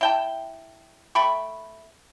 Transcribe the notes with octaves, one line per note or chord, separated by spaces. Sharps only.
E4 G5 A5
A3 G5 B5 C#6